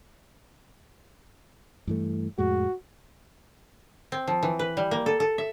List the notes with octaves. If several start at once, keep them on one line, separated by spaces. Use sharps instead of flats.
G2 E3 A3
F2 A2 G#3 F#4
C4
F3
E3
B4
G3
A#3
A4
A4
E5